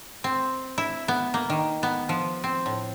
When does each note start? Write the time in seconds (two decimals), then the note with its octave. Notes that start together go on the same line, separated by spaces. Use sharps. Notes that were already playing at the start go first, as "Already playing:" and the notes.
0.24 C4
0.78 E4
1.08 B3
1.34 A#3
1.50 D#3
1.83 B3
2.09 F3
2.44 C4
2.66 A2